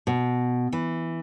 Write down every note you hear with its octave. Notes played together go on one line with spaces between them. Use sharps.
B2
E3